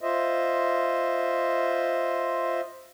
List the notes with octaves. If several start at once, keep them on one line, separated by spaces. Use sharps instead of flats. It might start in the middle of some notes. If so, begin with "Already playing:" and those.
F4 C5 D#5 E5